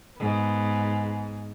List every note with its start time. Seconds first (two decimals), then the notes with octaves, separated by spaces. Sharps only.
0.20 G#2 B3